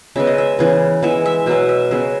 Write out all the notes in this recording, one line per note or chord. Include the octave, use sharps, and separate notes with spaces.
C#3 G#3 B3 E5
D#5
E5
C#3 E3 B3
E3 G#3 B3 E5
E5
B2 F#3 B3 E5
E5
C#3 G#3 B3 E5